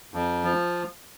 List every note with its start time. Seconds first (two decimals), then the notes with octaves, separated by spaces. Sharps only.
0.14 F2
0.44 F3